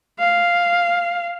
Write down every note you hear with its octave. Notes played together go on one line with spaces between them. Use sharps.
F5